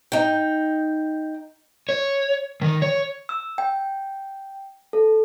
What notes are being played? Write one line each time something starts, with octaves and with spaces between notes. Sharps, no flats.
D#4 G5
C#5
D#3
C#5
E6
G5
A4